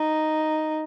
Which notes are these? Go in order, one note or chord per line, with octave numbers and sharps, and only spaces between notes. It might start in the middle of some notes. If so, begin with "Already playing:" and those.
Already playing: D#4